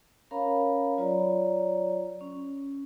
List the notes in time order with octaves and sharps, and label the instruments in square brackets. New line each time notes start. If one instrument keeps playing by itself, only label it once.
[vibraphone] C#4 A#4 C#5 F5 A#5 B5
F#3 F4 C#5 D5 A#5
C#4